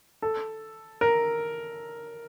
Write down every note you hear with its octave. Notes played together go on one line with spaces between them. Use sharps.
A4
A#4